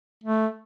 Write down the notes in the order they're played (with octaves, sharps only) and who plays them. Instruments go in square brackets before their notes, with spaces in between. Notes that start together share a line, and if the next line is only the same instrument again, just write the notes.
[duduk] A3